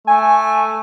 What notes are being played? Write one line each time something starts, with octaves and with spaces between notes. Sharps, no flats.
A3 G#5